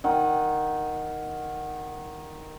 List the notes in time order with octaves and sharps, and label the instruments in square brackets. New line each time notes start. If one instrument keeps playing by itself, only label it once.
[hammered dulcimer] D#3 F#5